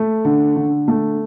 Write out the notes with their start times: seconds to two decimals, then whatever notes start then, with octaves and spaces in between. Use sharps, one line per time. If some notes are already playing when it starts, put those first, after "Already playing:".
Already playing: A3
0.25 D3
0.56 D3
0.88 A3